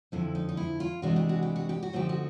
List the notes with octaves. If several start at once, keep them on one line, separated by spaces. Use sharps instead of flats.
F2 D3 F3 E4
D#4
D#4
E4
F4
C3 E3 G#3 B3 D4 F#4
G4
F#4
G4
F#4
G4
F#4
D3 F3 A3 C4 D#4 G4
F#4